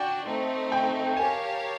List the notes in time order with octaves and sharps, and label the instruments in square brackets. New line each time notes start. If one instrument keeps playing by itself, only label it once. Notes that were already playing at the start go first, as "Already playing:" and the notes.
Already playing: [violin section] D4 F#4 [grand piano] G5
[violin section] A3 C4 D#4
[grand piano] G5
[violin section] G4 A#4 C#5 F5 A5 [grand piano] G#5